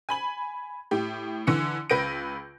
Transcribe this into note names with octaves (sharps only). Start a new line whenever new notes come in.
G#5 B5 F#7
A2 G4
D3 E3 C#7
C#2 B4 G6 A#6 D7